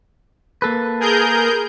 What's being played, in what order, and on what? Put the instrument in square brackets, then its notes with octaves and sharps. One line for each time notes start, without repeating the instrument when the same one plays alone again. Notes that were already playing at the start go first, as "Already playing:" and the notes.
[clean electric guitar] A#3 A4 B4
[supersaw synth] G#4 A#4 G6